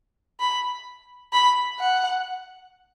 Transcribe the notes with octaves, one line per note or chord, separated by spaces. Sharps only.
B5
B5
F#5